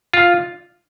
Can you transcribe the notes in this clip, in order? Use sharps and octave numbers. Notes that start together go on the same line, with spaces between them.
F4